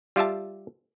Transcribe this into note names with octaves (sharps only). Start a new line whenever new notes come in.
G3 F4 G4 E5 A5